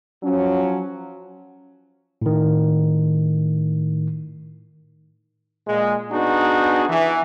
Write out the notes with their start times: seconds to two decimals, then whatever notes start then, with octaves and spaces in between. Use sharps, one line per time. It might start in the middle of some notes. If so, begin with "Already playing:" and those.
0.23 F3 F#3 C#4
2.22 A2 D#3
5.67 A#2 G#3
6.12 B3 D4 D#4 F#4 G#4
6.89 E3